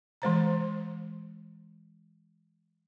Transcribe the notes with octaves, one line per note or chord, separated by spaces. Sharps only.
E3 G#3 C5 A#5